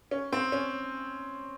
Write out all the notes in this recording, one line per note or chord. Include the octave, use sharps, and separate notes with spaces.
C#4
C4
C#4